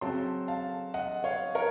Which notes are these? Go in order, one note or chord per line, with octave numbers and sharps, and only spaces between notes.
C#3 F#3 C4 A5 C6
F5 A5
D#5 F#5
C#5 F5
A#4 C#5